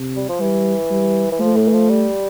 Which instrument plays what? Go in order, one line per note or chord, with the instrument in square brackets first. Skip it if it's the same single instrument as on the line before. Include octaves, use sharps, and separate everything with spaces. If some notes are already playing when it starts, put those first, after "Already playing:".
Already playing: [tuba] C3
[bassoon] G3
F3
[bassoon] E3 [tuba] G3
[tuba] G3
[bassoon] E3
[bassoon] F3 [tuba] A3
[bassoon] A2
E3
F3
G3